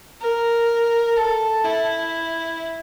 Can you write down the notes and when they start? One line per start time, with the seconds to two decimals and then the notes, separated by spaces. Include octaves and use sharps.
0.21 A#4
1.16 A4
1.64 E4